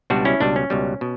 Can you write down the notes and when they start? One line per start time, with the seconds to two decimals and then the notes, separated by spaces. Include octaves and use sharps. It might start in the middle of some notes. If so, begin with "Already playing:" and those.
0.10 C#2 B2 G3 D4 F#4
0.25 C#4 E4
0.40 C#2 B2 G3 D4
0.56 C#4
0.70 C#2 B2 G3
1.01 B2